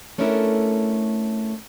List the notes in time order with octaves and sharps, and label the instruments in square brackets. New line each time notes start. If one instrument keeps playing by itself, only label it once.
[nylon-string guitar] A3 C#4 D4 E4 A4 A#4